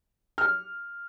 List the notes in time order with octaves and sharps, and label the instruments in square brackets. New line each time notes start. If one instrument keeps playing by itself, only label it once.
[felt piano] F6